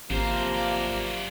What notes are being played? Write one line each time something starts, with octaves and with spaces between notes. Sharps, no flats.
G#1 C3 E3 F3 A#3 C5
F#2 D5